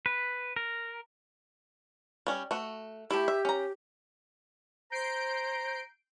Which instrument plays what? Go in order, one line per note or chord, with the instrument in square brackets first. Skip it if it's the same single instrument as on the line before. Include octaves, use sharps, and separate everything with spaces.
[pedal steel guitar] B4
A#4
[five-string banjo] G3 C#4
A3 F#4
[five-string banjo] A3 E4 [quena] G4
[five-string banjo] E5
C#4 A#5
[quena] C5 [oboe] A#5 [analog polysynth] G6 C7 D7